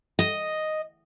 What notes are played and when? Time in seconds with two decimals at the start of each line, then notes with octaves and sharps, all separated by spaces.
0.19 D#5